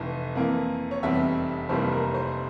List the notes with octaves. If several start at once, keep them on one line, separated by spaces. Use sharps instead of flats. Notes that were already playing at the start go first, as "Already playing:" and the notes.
Already playing: F1 F2 E3
F2 E3 A#3
C#5
F1 E2 C3 G3 E5
F1 F2 E3 G3 A#3 C5
A#4
C5